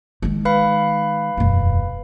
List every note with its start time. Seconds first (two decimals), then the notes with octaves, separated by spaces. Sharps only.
0.22 D#3 G#3
0.45 B4 F5 B5
1.37 E1 F#2